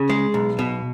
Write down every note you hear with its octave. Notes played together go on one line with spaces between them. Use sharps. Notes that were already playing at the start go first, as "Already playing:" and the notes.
Already playing: C#3
G#3
B1
B2